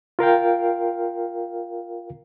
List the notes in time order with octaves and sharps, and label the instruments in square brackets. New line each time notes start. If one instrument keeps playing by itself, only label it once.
[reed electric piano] F4 A#4 F5 G5